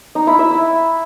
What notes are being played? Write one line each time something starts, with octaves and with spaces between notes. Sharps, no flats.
D#4
E4
E5
E4